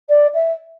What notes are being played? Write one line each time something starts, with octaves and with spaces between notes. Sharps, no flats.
D5
E5